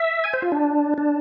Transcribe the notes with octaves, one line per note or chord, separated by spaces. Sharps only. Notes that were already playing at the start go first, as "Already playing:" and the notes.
Already playing: E5
G#5
C5
F4
D4
D4